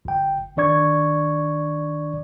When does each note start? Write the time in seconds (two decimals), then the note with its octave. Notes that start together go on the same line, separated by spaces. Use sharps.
0.05 G1 G5
0.56 G1 D#3 D4 D5 C#6 G#6